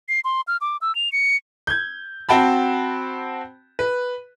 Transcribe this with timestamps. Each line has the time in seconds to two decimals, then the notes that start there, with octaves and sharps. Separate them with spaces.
0.08 C7
0.24 C6
0.47 F6
0.61 D6
0.81 E6
0.95 F7
1.12 C#7
1.67 G6 G#6
2.29 C4 F#4 G5 A5 B5
3.79 B4